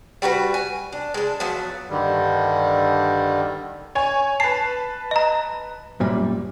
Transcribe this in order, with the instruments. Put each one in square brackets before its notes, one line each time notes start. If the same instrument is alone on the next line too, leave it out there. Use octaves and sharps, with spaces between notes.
[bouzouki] G3 F#4 A#4 B4
G#5
D4
G#3 A5
F3 F#3 B3
[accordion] G2 D3 D#3 G3
[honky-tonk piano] C#5 G#5
[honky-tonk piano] B4 A5 [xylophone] C7
[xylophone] D#5 A#5
[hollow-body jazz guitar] F#2 A#2 G3